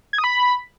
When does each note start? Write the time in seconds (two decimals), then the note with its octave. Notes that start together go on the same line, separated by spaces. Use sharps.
0.13 G#6
0.18 D#6
0.24 B5